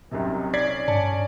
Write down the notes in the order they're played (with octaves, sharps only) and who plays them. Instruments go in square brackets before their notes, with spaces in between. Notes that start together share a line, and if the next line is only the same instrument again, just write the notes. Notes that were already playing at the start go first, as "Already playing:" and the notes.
[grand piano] C2 F#2 C3 [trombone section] D#3
[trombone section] C#4 [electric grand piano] D5 [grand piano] G#6 B6 C7
[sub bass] G2 [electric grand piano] D5 [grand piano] A5 C#7